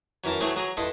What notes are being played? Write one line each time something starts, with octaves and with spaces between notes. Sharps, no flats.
F#2 E3 A#4 A5
E3 F#3 A3 C4 G#4
F#3 G#4 G#5 A#5 D#6
G2 E4 A4 D#5 C6